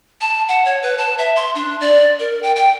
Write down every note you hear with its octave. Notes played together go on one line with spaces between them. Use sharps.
A5
F#5
C#5
B4
A5
E5
C6
D4
D5
A#4
G5
G5